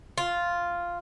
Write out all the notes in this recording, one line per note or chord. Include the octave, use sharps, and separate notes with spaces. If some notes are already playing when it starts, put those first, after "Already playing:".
F4